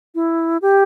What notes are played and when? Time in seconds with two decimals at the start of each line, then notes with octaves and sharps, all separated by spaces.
0.15 E4
0.62 G4